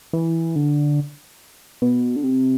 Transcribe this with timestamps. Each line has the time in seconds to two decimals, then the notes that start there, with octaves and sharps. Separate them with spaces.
0.13 E3
0.56 D3
1.82 B2
2.16 D3
2.24 C3